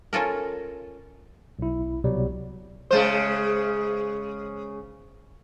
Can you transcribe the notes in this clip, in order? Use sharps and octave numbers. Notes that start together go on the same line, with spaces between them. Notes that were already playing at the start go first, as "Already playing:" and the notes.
C#4 F4 A4 A#4
B1 E4
C2 B2 F#3 G3
C#3 G#3 C5